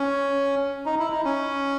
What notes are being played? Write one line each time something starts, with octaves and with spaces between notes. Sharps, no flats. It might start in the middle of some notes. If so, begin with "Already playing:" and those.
Already playing: C#4
D#4
E4
D#4
C#4